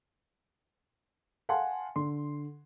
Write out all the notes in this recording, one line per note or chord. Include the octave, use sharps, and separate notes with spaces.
F5 F#5 G#5 A5 C6
D3 C6